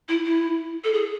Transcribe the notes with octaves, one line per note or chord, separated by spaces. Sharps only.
E4
E4
A4
G#4